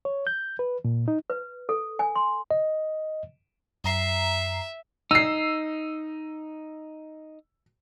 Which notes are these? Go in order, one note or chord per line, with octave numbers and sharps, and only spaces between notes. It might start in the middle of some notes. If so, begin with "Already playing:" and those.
C#5
G6
B4
A#2
D#4
B4
A4
G#5
C6
D#5
F#2 E5 A#5 C7
D#4 E6 C7